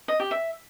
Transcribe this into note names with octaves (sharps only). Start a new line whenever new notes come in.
D#5
G4
E5